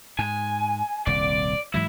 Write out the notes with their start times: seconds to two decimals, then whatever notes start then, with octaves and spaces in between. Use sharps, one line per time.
0.19 G#2 G#5
1.07 D#1 C2 D5
1.74 G#2 E3 F#3 E4